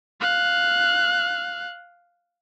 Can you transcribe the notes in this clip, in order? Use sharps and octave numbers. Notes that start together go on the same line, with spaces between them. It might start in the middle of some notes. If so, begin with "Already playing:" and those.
F5 F#6